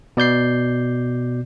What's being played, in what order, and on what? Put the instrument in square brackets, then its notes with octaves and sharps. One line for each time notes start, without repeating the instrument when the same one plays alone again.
[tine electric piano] B2 D5 G6 C7